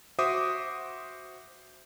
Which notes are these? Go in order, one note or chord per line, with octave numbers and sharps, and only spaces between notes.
F#4 C5 E5 D6 D#6